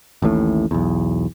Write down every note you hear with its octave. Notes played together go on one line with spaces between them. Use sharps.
A1 D#2 A2
B1 E2